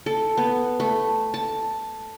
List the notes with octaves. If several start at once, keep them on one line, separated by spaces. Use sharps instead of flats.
A4
B3
A3
A5